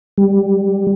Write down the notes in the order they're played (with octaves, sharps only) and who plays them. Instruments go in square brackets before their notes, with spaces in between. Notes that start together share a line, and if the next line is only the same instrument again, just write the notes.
[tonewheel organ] G3